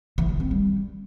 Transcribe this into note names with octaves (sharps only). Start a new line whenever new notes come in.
E3
D#3
C4
G3